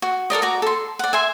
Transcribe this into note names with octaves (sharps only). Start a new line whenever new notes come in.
F#4
A4 A#4 D5 D#5
F#4 D5 A#5
A4 C6
D5 F#5
E5 G#5 C6